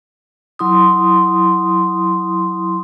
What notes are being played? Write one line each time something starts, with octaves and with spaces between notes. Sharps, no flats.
F#3 E4 C6 D#6